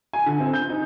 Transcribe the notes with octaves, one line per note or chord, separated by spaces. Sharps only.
G#5
D3
C4
G6
D#4